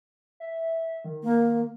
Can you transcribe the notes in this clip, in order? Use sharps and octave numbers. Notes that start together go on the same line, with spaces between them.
E5
D#3
A#3